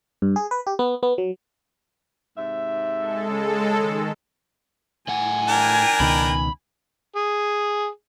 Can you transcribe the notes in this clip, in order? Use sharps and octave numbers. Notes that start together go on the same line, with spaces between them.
G2
G#4
B4
G4
B3
B3
F#3
G#2 C3 E5
G#3 A4
C#3
D#3
A2 F#5 G#5
D4 A#4 G5
C#2 B2 D#3 B5
G#4